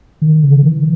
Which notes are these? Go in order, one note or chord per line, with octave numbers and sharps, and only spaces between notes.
D#3
C#3
E3